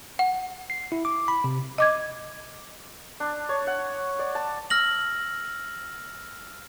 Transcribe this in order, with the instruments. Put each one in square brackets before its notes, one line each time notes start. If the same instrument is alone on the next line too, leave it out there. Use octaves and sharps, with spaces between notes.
[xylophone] F#5
[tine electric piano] C7
E4
D6
B5
C3
[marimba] D#5 D6 G#6
[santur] D4
C#5
F#5
D5
A5
[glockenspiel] E6 F6 A#6 F#7